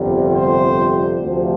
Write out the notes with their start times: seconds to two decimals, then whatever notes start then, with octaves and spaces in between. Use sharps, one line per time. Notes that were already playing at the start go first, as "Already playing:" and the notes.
Already playing: G1 F2 C3 G3
0.33 C5
1.20 D2 C3 F3